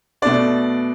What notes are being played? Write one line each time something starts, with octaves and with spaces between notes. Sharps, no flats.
B2 A3 D4 D5